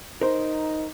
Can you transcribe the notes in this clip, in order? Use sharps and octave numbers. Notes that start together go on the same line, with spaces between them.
D#4 A#4 C5